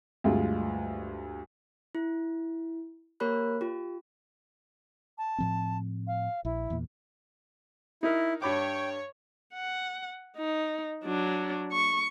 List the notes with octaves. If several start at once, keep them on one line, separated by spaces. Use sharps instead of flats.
D2 G2 G#3 F4
E4
A#3 G4 A#4 C#5 B5 F#6
F4 G4
A5
A2 F3 C4
F5
A#1 E4
E2 A#2
D#4 E4 A#4
G2 C#5 G5 B5 D6
F#5
D#4
F#3 D4
C#6